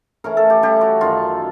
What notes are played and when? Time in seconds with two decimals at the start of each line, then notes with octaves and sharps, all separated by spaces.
0.24 C#3 E3 A3 C#4 A#4
0.37 A4
0.50 G4
0.62 C#3 E3 G3 G4
0.81 F#4
1.01 F#2 D#3 F#3 F4